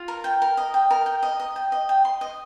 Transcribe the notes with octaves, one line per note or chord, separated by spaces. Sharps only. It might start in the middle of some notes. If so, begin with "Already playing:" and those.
Already playing: F4
A#4
G5
A#4
D#5
G5
A#4
G5
D#5
D#5
G5
D#5
G5
C6
D#5